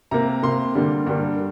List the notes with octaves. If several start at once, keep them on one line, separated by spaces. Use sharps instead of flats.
C3 A#3 A#5
C3 A#3 C6
G2 D3 G3 A#3
G2 D3 G3 A#3